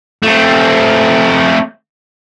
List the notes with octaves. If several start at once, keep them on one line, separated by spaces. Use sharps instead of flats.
A3 C4